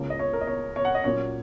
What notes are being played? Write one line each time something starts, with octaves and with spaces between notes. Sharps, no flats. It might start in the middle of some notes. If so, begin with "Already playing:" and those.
Already playing: C#2 C#3 A#3 C#4
D#5
C#5
A#4
D#5
C#5
C#5
F#5
D#5
A#2 F#3 A#3 C#4 C#5